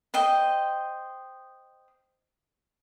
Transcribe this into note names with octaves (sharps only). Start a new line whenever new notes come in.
C5 D#5 G5